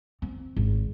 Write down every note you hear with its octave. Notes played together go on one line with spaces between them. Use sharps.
C4
G#1